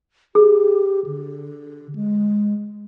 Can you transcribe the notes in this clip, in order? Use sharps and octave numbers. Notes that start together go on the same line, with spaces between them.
G4 G#4
D3
G#3